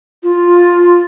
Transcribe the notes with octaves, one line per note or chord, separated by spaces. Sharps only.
F4